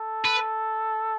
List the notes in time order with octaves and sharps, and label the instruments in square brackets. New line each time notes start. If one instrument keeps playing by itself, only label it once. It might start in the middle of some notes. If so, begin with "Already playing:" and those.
Already playing: [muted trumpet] A4
[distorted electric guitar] B4